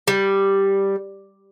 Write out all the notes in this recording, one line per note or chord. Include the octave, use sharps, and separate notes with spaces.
G3